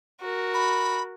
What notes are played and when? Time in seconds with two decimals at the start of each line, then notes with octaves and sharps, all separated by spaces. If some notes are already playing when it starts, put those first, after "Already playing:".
0.21 F#4 A#4
0.54 B5